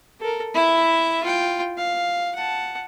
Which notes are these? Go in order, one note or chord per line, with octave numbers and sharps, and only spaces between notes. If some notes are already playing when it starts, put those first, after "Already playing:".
A4 A#4
E4 E5
F4 G5
F5
F#5 A5